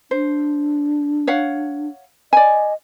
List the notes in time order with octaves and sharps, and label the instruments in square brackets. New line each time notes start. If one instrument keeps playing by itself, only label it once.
[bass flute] D4 [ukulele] C5
[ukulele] C#5 F5 F#5
[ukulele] D5 G#5 [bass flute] D#5